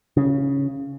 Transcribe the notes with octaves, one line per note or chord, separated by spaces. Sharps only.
C#3